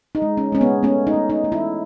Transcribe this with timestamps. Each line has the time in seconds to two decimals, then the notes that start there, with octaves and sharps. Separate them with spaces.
0.15 D#4
0.22 G#3
0.37 C#4
0.52 G#3 C#4
0.61 B3
0.83 A3 C#4
1.07 D#4
1.14 A3
1.30 D#4
1.44 A3
1.52 E4